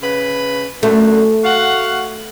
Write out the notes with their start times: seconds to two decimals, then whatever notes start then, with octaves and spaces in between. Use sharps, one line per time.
0.01 C#3 B4
0.83 F#2 D3 A3
1.44 F#4 F5 F#5